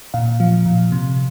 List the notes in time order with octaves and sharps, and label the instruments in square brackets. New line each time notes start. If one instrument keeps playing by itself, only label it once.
[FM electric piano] A#2 F5
F3
A#2
C3